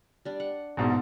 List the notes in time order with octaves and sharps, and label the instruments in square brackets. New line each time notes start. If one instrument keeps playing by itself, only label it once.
[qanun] G3 D4
F#5
[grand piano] A#1 G#2 B2